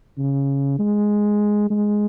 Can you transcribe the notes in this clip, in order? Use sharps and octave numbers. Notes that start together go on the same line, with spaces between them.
C#3
G#3
G#3